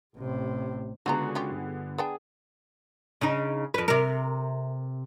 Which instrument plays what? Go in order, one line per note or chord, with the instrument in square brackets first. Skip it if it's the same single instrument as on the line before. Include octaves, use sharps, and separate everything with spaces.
[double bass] A1 C3
[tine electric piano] C#2 F#4 [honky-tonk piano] D3 B3 G#4 [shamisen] A3 F4 A#5
[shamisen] C#4 F4 G4
[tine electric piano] G1
[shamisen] B3 D4 G5 [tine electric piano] G#4
[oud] C#3 D#4
F2 B4
C3 A#4